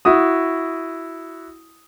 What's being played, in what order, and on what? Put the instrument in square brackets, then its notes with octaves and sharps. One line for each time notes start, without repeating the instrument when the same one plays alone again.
[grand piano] E4 F#4 D#6